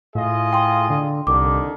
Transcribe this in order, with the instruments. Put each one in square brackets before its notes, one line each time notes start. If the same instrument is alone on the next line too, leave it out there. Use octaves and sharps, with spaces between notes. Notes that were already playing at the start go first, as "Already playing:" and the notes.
[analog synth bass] A2 [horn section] F4 G#4 D#5
[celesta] G5 C6
[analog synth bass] D3
[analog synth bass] C2 [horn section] D3 D#3 [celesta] D6